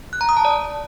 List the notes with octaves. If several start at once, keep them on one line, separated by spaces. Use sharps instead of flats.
F#6
A#5
D#6
A5
D5